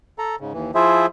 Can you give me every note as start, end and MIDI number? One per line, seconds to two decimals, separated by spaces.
0.19 0.36 69
0.19 0.36 82
0.40 0.52 44
0.40 0.52 49
0.53 0.71 39
0.53 0.71 52
0.75 1.06 53
0.75 1.06 64
0.75 1.06 65
0.75 1.06 68
0.75 1.06 72
0.75 1.06 76